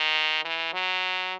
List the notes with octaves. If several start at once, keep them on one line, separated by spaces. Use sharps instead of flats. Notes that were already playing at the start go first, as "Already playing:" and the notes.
Already playing: D#3
E3
F#3